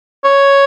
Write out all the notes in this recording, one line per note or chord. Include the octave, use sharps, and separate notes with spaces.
C#5